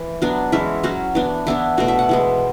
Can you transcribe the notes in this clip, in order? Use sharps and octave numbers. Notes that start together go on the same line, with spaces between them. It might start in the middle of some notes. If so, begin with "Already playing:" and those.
Already playing: E3
F#3 B3 D4
E3 G#3 C#4 E5
F#3 C#4 F#4
E3 B3 D4
E3 B3 D4 E4
B2 A3 D4 F#4
E5
F#5
E3 G#3 B3